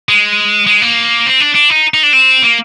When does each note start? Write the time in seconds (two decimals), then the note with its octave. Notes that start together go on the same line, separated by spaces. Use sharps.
0.09 G#3
0.67 G#3
0.82 A#3
1.26 C4
1.40 D4
1.55 D4
1.70 D#4
1.94 D#4
2.03 D4
2.13 C4
2.43 A#3